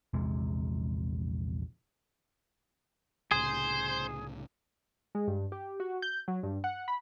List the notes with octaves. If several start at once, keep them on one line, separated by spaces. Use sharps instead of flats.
A#1 E2 C3 G#3
C2 A2 C#3 G#4 C5
G#3
G2
G4
F#4
G6
F#3
G2
F#5
B5